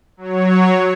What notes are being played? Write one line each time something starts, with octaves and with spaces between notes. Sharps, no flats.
F#3 C#5